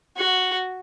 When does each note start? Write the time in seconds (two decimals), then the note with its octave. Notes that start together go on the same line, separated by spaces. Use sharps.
0.18 F#4